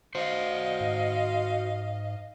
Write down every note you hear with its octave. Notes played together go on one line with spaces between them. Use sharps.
F#4 C5 D#5 F5
G#2